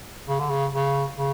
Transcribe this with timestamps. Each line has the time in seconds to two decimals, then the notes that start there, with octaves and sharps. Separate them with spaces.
0.29 C#3
0.40 D3
0.50 C#3
0.73 C#3
1.17 C#3